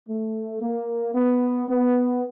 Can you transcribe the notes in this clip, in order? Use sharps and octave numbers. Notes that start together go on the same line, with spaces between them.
A3
A#3
B3
B3